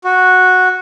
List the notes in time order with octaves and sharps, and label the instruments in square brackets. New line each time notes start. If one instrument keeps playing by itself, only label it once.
[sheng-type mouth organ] F#4